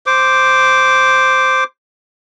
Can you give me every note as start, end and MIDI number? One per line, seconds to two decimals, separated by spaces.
0.06 1.64 72
0.06 1.64 86